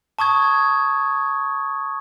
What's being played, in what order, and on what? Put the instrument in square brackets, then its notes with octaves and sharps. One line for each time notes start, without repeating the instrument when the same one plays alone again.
[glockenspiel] A5 C#6 D#6 G#6